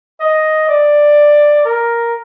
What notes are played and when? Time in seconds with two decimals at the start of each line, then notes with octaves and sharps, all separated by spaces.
0.20 D#5
0.69 D5
1.65 A#4